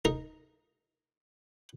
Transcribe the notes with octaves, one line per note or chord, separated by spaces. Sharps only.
D#4 A#4